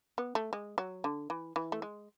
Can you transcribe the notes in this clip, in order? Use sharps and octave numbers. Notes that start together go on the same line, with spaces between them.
B3
A3
G#3
F#3
D3
E3
E3
A3
G#3